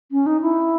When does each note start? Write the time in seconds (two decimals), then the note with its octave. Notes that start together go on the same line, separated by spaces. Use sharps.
0.12 C#4
0.26 D#4
0.41 E4